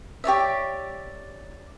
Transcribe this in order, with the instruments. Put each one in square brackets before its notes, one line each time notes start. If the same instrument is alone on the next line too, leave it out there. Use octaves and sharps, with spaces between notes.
[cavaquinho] G4 C#5 D5 E5